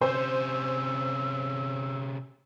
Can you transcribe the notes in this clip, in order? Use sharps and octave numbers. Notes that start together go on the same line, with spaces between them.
C3 C#4 C5 E6